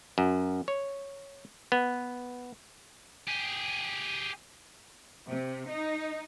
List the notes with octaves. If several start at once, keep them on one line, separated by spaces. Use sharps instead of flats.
F#2
C#5
B3
G4 G#4
C3
D#4